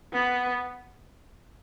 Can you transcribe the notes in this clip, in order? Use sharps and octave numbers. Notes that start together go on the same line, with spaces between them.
B3